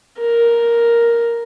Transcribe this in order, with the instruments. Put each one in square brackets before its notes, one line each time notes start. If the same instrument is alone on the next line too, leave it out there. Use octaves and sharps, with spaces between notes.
[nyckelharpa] A#4